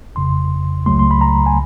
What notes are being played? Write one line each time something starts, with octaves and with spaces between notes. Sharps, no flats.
G1 F2 C#3 C6
C#2 C#3 F#3 A3 C6
C6
B5
A#5
G#5